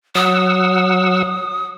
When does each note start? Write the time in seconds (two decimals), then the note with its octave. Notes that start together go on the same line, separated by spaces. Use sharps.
0.15 F#3 F#5 D#6 E6